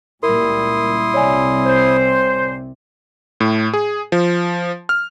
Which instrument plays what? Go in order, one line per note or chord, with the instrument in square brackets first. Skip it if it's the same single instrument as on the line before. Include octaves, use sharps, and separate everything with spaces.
[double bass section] C#2 A#2 G3 [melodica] E4 C6 D#6 [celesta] A#4
[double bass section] C2 C3 [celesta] C#5 D5 G#5
[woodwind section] C5
[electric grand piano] A2
G#4
F3
F6